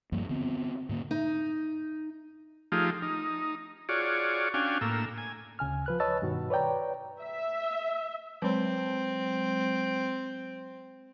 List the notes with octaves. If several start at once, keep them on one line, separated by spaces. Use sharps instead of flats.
G2 F3 G3 A#3
D3 B3 C4
G#2 D3 A#3
D#4
F3 A3 D#4 F4 G4 G#4
D#4
F4 F#4 G#4 C#5 D5
C#4 D4 F#4 F5 G5 G#5
A2 A#3 E6
G#5
D2 C#3 G#5 F6
F3 B4 F#6
B4 C#5 D#5 A5 E6 A6
G2 B2 D#3 F#4
B4 C#5 D5 G5 A#5
E5
F#3 G#3 C4